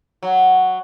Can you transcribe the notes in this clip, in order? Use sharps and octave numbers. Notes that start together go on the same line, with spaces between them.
F#3